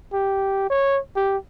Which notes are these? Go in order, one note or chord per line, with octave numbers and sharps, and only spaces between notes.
G4
C#5
G4